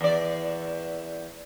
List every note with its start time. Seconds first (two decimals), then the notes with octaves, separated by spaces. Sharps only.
0.01 E2 D5